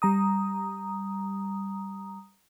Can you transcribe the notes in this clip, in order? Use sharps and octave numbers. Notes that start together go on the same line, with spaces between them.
G3 A#5 D#6